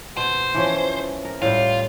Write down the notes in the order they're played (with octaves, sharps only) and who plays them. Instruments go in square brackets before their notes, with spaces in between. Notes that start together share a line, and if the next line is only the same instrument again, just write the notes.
[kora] B2 [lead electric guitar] C5
[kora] E3 F3 C#4
A#4
[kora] A2 G3 [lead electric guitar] F4